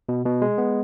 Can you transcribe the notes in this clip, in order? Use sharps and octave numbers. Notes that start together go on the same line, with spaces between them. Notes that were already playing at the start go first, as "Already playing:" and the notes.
B2
B2
G#3
B3